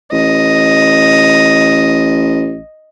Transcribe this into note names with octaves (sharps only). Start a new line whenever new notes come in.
A1 D#5